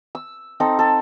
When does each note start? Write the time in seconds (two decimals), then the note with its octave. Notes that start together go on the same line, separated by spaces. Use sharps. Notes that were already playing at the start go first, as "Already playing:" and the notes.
0.15 E6
0.60 C4 D#4 A4
0.79 A4